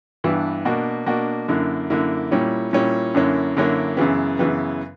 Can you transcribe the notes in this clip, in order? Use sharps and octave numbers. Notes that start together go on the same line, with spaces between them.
G2 E3 B3 D4
B2 A#3 D4 F#4
B2 A#3 D4 F#4
F#2 D3 A#3 E4
F#2 D3 A#3 E4
A#2 G3 C#4 E4
A#2 G3 C#4 E4
F#2 D3 A#3 C#4 E4
F#2 D3 A#3 C#4 E4
F#2 C#3 E3 B3
F#2 C#3 E3 B3